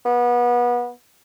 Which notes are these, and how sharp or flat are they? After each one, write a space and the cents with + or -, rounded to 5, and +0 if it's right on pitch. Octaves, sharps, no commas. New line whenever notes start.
B3 -25